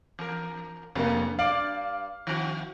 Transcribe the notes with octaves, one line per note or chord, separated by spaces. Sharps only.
E2 A#4
F1 F2 A#3
G2 D5 F5
D#3 C4 F#4